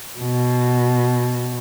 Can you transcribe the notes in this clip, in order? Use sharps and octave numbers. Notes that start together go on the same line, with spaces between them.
B2